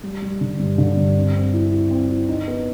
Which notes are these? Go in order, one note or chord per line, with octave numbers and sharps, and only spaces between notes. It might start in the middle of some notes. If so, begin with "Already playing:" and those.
G3
G3
D3
G2
D3
G2
C4
C4
E4
E4
C4
E4
D#4
B3